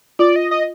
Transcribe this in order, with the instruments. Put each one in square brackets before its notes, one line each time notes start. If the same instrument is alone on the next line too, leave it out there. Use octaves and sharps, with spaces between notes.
[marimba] F4 [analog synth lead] D5
[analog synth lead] D#5
D#5